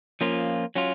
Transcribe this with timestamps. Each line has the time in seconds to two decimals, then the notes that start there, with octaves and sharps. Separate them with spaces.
0.21 F3 A#3 C#4 F4
0.75 F#3 C#4 F4